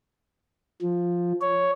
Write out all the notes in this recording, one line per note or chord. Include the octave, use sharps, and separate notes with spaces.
F3
C#5